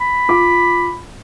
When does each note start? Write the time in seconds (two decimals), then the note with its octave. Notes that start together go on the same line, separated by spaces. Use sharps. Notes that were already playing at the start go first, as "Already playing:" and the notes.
0.01 B5
0.28 F4 D6